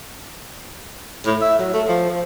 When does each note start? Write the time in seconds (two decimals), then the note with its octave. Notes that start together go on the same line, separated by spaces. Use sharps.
1.26 A2
1.42 E5
1.59 F#3
1.73 A3
1.88 F3
2.10 F3